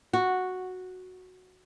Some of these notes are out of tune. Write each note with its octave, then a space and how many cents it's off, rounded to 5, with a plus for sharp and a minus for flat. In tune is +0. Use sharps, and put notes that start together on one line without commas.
F#4 -5